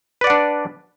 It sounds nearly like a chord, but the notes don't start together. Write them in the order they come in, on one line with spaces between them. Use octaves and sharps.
B4 D5 F#5 D4